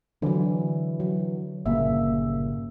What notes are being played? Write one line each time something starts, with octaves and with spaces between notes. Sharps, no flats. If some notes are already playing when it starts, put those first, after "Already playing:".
D3 E3 F#3
F#3
G1 A#2 C#3 A#3 E5